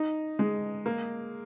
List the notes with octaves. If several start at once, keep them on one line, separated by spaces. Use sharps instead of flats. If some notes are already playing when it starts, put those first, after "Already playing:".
Already playing: D#4
G#3
A#3